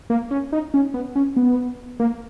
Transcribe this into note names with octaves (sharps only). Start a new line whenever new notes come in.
A#3
C#4
D#4
C#4
B3
C#4
B3
A#3